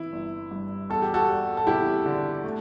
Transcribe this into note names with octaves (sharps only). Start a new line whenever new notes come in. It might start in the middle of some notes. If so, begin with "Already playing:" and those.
Already playing: E3 E4
G1
G2
E2 A4
G4
F#4 A4
G3
A4
E2 E4 G4
D3
A3